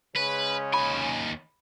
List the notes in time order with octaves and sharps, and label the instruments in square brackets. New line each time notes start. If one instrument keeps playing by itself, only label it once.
[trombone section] C#3 G#3 C#4 [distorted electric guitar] B4
[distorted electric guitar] D#2 G#5 [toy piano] B5